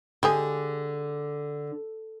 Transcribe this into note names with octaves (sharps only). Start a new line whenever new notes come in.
D3 G#3 G4 G#4